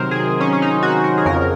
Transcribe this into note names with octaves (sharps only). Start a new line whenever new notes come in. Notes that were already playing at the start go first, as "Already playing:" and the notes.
Already playing: C3 D#3 F#3 A#4 C5
G#4
C#4
C#4
D#4
F#4
A#4
G#4
F2 C#3 F3 A#4